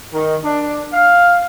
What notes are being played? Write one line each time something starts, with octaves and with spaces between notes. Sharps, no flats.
D#3
D4
F5